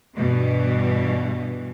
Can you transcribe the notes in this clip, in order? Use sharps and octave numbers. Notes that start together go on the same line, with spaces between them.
G2 B2 E3